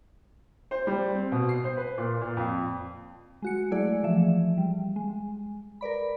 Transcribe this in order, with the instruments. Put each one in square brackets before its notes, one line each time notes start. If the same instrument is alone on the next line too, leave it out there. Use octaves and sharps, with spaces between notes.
[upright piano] C5
G3
C4
B2
C7
C5
B4
A#2
A#2
F2
[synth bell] G#3 F#4 C#7
F#3 G#3 A3 E4 G#4 D5
E3 F3 A3 E5
G3
G#3
A#4 B4 D5 B5